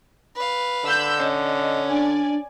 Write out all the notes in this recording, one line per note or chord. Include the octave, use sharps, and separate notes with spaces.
B4 F5
D3 B5 E6 G6
C#4 D#5
D4 D5 G#5